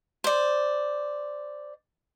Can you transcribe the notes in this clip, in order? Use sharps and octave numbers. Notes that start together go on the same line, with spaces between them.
C5 D5